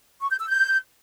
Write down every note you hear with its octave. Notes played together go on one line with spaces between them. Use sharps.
C#6
G6
E6
G6